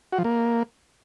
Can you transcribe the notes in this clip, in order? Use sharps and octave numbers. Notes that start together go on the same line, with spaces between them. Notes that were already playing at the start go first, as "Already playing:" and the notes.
F#4
F3
A#3